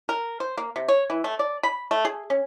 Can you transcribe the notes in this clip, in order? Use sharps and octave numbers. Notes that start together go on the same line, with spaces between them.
A#4
C5
A#3
C3
C#5
E3
A3
D5
B5
A3
G#4
C#4